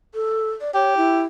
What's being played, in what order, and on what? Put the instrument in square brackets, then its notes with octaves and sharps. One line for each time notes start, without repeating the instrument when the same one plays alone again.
[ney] A4
D5
[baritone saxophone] G4 [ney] C#5
[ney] E4